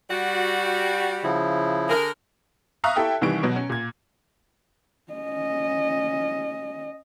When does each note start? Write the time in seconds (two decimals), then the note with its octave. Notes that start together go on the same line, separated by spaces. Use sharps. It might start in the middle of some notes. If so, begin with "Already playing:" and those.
0.10 G3 F#4
1.24 C#3 F3 E4
1.88 D3 G#4 A#4
2.84 E5 F5 A#5 C#6 D#6 F#6
2.96 E4 G4 A4 E5 G5
3.21 C2 D#3 E3 G3 C#6 D7
3.43 B2 F#3
3.56 C#4
3.70 A#2 G#6
5.12 C#4 D#5